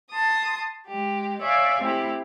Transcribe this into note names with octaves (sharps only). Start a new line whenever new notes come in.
A5 C6 D#6
G#3 G4
C#5 D5 E5 F5 G#5
A3 C4 E4 G4